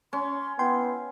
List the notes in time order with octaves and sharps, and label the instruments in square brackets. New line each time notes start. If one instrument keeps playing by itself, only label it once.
[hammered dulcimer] C#4 [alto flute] C6
[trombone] B3 [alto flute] E4 [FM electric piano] G5 C6